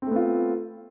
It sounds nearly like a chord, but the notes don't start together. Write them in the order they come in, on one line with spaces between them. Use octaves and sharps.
C4 A3 B3 F4